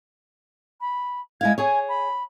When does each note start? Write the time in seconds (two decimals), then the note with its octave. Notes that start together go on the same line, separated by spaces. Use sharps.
0.81 B5
1.41 G#3 E4 F5 G#6
1.58 G#4 C#5 G#5
1.89 B5